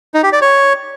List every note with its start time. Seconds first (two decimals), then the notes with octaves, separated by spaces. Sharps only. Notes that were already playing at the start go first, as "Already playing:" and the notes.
0.14 D#4
0.23 G4
0.32 D5
0.42 C#5